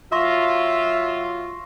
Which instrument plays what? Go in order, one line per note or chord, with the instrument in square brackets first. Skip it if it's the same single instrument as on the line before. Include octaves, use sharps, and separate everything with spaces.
[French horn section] F#3 F4 [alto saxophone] E5 [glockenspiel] C6 C#6 A#6